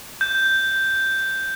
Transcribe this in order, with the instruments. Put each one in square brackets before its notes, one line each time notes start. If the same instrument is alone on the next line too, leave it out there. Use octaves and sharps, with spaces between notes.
[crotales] G6